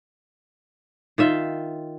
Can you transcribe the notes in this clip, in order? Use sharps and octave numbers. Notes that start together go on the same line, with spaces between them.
D#3 F4 E5